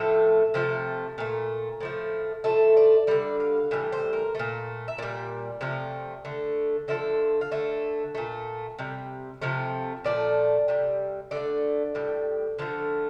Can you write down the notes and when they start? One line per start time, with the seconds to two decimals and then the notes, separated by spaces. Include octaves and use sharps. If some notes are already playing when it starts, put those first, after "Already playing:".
Already playing: A2 F3 A3 E5
0.54 C3 F3 A3
1.18 A#2 A3
1.80 A2 F3 A3
2.44 A2 F3 A3 E5
2.77 D5
3.07 D3 G3 D5
3.40 F5
3.71 A2 E3 G3
3.92 C5
4.13 A#4
4.35 A#2 A3
4.88 E5
4.98 A#2 G3 D5
5.61 C3 F3 A3
6.25 D3 A3
6.88 D3 F3 A3 E5
7.41 F5
7.51 D3 A3 E5
8.15 A#2 A3
8.79 C3 G3
9.41 C3 F3 A3
10.04 A#2 F3 A3 D5
10.68 C3 G3
11.31 D3 A3 D5
11.95 A2 G3
12.58 D3 F3 A3